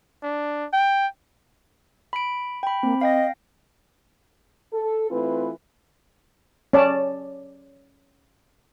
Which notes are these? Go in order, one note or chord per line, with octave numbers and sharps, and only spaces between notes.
D4
G5
B5 D7
G5 B5
A#3 C4
D#5 F5 G5 A#6
A4
E3 A3 C4 F4 B4
C#4 D5 A5